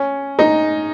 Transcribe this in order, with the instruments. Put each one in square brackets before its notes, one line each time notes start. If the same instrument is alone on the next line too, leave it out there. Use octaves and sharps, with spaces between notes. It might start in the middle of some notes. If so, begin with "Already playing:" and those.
Already playing: [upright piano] C#4
D#4